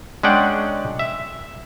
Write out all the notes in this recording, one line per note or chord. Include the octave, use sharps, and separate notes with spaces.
G#3 C#4 D4 D5 F#5 G5
E5